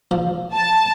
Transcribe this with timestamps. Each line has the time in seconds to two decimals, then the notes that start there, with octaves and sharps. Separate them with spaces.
0.11 F3
0.53 A5